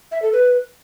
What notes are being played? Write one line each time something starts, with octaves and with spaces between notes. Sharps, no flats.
E5
A4
B4